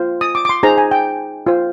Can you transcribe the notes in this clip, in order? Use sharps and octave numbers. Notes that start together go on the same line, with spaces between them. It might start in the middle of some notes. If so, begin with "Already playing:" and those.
Already playing: F4 C5
D#6
D6
D6
C6
D#4 G#4 C5 A#5
G#5
G5
F4 C5